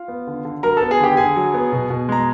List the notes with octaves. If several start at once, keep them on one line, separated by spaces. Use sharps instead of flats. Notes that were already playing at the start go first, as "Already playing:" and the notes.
Already playing: F4 F5
B3
D3
D3
F#3 A#4 A#5
B3 A4 A5
G#4 G#5
D3 G4 G5
D3 G#4 G#5
F#3
B3
B2
B2
G#3 A#5